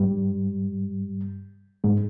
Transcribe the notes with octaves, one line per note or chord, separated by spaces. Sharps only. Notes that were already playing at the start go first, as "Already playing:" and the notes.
Already playing: G2 G3
G#2 G#3